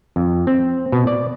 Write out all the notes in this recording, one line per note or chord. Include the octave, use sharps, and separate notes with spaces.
F2
C4
B2
D5